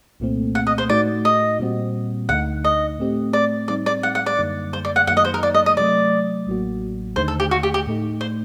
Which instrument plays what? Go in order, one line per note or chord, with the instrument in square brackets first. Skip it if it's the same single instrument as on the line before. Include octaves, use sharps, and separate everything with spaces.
[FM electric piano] C2 A#2 A3 C4
[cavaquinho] F#5
D#5
C5
[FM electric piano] A2 A3 D#4 F#4 [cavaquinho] D5
[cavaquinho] D#5
[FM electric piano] A#2 G3 C4 F#4
[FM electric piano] D2 D3 A3 D#4 [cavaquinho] F#5
[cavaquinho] D#5
[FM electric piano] A2 A3 C4 G4
[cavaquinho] D5
[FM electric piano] A2 G3 C4 D#4 [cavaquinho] D5
[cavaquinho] D5
F#5
F#5
D5
[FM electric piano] F#2 D3 G3 A#3 D#4
[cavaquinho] C5
D5
F#5
[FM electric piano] F#2 D#3 F#3 A#3 D#4 [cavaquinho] F#5
[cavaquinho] D#5
C5
A#4
D5
D#5
D#5
[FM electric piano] C3 F#3 A3 [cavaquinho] D5
[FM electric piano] A1 A2 F#3 A#3 F#4
[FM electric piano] D#2 D3 A3 D#4 [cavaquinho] C5
[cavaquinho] A4
G4
F#4
G4
G4
[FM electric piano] A2 A3 D#4
[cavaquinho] C5